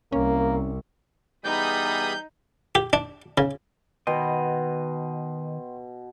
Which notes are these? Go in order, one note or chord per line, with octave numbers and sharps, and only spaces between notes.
C2 A#3 C#4
E3 G3 B3 D#4 G#4 B5 D#6 G6
G4
D4
C#3
B2 D#3 D#5 F#5 G5 C6